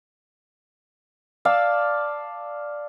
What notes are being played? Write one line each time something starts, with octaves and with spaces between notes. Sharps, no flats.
D5 F5 A5 E6